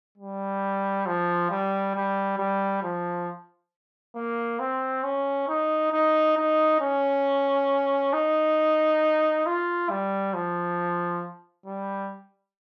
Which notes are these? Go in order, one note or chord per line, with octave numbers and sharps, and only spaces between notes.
G3
F3
G3
G3
G3
F3
A#3
C4
C#4
D#4
D#4
D#4
C#4
D#4
F4
G3
F3
G3